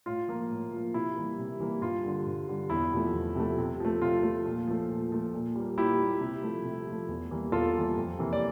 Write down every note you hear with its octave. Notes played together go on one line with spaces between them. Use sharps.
A2 F4
F3 A#3
A2
F3 A#3
C3 E4
E3 G3 A#3
C3
E3 G3 A#3
G2 F4
D3 G3
G2
D3 G3
E2 E4
C3 F3 A3
E2
C3 F3 A3
C3
F3 A3
C3 F4
F3 A3
A#2
F3 A3
A#2
F3 A3
A#2
G3 A#3
A#2 E4 G4
G3 A#3
C3
F3 A3
C3
F3 A3
E2
E3 G3 A#3
E2 F4 A4
E3 G3 A#3
F2
C3 E3 A#3
D5